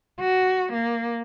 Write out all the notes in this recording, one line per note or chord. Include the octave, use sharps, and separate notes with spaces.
F#4
A#3